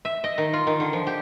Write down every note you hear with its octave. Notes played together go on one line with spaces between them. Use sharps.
E5
D#5
D#3
F4
D#3
D3
F3
G4